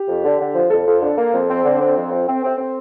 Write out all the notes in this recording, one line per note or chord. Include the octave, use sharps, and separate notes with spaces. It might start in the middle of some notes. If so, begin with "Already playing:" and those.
Already playing: G4
F2
D3
D3
F3
F2 A4
F2
D3
A#3
F2
C4
D3
C4
F2
C4
C4
C4
C4